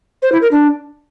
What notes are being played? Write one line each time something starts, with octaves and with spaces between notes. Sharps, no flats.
C5
E4
A#4
D4